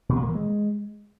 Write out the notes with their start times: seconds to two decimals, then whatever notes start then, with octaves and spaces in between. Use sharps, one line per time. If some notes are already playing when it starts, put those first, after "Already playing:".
0.09 B2
0.16 A#2
0.22 A#3
0.29 E3
0.35 G#3